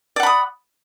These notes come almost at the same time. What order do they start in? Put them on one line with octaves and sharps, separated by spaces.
D5 F#5 B5 D#6